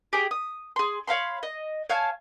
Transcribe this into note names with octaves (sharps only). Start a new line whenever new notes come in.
G4 G#4 G5
D#6
G#4 C6
C#5 F5 B5 C6
D#5
C#5 F5 G#5 A5